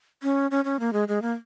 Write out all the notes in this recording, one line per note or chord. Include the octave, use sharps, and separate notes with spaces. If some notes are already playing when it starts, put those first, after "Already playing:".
C#4
C#4
C#4
A#3
G#3
G#3
A#3